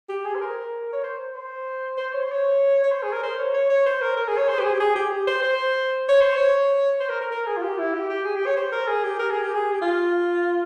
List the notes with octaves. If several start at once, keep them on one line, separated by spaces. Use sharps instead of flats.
G4
G#4
C5
A#4
C#5
C5
C5
C5
C#5
C5
C#5
C#5
C5
G#4
A#4
C5
C#5
C#5
C#5
C5
A#4
A#4
G#4
C#5
C5
G4
G#4
G4
G#4
G4
C5
C5
C#5
C5
C#5
C5
A#4
A#4
A#4
G#4
F4
G4
E4
G4
G4
G#4
G4
C#5
C5
A#4
G#4
G4
A#4
G#4
G4
G#4
G4
F4